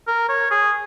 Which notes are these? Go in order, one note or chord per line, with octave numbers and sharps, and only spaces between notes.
A#4
C#5
G#4